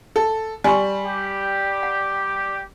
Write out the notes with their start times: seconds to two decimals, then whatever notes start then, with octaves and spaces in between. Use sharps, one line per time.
0.16 A4
0.64 G3 G#5 C6 C#6
1.04 G4
1.83 F#5